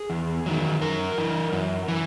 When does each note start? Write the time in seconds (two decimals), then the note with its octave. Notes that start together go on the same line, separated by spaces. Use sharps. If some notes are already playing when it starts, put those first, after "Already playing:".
Already playing: G#4
0.10 E2
0.46 D#3 F#3
0.81 F#2 A#4
1.18 E3
1.53 F#2
1.88 E3